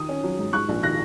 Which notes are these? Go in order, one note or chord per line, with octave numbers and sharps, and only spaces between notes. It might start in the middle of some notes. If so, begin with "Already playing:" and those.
Already playing: D#3 D#6
C#4
F#3
G#2
G#2 C#6 F#6
A#1
D#3 F#6 A#6